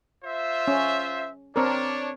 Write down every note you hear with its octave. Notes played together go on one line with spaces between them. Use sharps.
F4 C5 E5
C#4
C4 D4 A#4 C#5